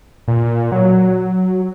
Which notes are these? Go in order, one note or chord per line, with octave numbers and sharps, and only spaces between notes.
A#2
F#3